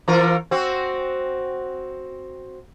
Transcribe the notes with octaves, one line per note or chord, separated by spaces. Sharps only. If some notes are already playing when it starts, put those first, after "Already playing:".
E3 F4 A#4
C4 F#4